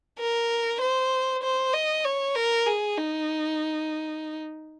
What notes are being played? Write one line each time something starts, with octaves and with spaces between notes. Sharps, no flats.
A#4
C5
C5
D#5
C#5
A#4
G#4
D#4